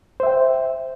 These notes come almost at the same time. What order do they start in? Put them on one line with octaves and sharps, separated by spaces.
C5 E5 G5